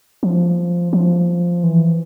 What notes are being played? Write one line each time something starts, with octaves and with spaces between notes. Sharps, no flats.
F3
F3
E3